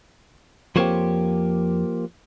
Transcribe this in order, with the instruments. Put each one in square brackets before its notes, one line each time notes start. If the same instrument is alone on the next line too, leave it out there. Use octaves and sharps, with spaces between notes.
[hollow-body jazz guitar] F2 C5 C#5 [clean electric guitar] F3 A#3 G4